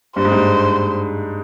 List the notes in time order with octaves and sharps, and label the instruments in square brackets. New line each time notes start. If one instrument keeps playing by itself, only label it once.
[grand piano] G2 [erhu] C5
[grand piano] G#2
G2